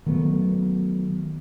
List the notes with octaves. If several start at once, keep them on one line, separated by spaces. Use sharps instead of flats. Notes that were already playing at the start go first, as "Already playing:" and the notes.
D#3 F#3 A3 B3